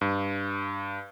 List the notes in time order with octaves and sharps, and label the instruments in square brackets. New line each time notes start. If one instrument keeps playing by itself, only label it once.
[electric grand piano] G2